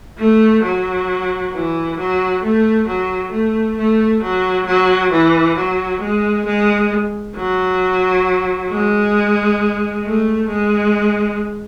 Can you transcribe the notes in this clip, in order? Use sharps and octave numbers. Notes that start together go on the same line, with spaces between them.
A3
F#3
E3
F#3
A3
F#3
A3
A3
F#3
F#3
E3
F#3
G#3
G#3
F#3
G#3
A3
G#3